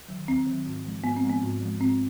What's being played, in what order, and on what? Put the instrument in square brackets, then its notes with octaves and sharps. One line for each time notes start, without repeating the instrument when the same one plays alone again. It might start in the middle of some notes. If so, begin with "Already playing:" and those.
[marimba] D#3 F#3
D#2 C4
D#3 F#3
G#2
F3 G#3
G#2 B3
C4
F3 G#3
B3
G#2
F3 G#3
G#2 C4